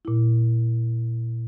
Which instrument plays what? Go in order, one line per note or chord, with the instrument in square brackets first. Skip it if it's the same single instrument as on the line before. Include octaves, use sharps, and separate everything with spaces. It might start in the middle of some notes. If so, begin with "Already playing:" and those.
[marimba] A#2 E4